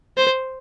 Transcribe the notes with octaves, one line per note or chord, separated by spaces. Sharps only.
C5